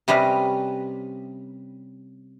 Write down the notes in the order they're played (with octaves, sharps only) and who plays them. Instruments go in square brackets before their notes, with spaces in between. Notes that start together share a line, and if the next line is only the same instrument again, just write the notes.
[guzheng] C3 G3 C#4 B4 D#5